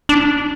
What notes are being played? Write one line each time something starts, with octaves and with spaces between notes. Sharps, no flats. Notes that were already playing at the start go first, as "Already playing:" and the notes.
D4